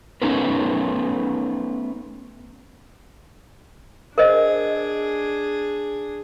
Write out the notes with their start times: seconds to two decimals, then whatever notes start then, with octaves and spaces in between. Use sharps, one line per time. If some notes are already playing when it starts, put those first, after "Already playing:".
0.22 A3 B3 C#4 D#4 A#4 B4
4.18 D4 G#4 A#4 C5 D#5